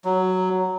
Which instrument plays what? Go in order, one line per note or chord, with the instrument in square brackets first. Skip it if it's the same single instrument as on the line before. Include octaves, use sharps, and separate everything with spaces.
[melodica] F#3